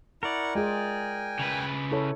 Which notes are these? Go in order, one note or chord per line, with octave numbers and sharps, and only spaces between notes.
E4 A#4 D5 F#5 C#6
G#3 F4 G#4 G5 G#5
C#3 B4
E4 A4 C#5